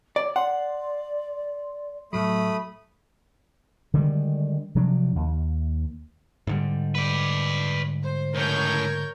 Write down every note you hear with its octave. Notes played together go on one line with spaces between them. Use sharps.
C#5 D5
D5 F#5 C6
A2 F#3 A3 B5 D#6
D3 D#3 G3 G#3
C3 F3 F#3 D4
D#2
G#2 D3 G3
B4 D5
C5
C#2 A2 A#4 C#5 G6